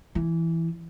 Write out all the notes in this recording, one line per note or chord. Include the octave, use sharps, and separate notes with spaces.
E3